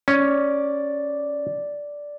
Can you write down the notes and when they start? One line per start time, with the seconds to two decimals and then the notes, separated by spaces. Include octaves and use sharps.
0.08 C#4 D5